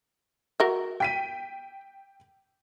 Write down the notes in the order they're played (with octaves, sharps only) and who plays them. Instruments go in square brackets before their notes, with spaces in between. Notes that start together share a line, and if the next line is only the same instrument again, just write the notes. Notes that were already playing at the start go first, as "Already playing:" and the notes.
[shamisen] F#4 A#4 E5
[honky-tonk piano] G5 B6 D#7